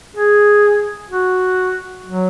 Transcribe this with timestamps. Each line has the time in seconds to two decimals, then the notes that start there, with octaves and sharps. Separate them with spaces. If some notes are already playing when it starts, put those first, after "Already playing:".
0.16 G#4
1.11 F#4
2.06 F#3